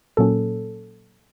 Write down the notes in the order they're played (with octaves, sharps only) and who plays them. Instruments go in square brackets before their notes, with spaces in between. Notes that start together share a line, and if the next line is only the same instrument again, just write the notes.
[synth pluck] A#2 F#3 A#3 C#4 A4